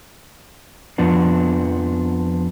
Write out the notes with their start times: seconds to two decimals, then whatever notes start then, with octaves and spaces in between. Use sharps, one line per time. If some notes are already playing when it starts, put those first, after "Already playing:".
0.98 F2 F3 B3 D4